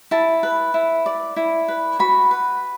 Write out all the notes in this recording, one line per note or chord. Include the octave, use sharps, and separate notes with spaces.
E4 A5
B4
E4
D5
E4
B4
F#4 B5
B4